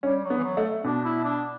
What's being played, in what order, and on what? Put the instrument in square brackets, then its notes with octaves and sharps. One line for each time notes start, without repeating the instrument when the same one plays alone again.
[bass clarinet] G3 [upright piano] C#4
[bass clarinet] F#3
[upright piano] B3
[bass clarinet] E3
F#3
[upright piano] A3
[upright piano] B2 [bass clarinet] D4
[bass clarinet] E4
D4